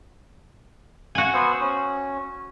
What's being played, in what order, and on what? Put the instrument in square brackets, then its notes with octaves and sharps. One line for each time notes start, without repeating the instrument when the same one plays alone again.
[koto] F#4 G#5
[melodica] B3 C5 E6
C#4